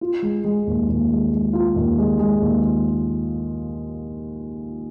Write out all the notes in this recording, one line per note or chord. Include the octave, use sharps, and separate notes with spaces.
F4
G#3
G#3
D#2
D#2
G#3
G#3
F4
D#2
G#3
G#3
D#2